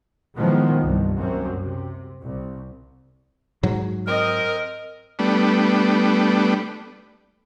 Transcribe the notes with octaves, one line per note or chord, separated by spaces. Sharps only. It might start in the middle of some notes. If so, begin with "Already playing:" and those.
A2 D#3 F3 F#3 G#3 B3
C2 G2
F#2 A#3 C4
C3
C2
G#2 F#3
C4 A#4 D#5
G3 A3 B3 D4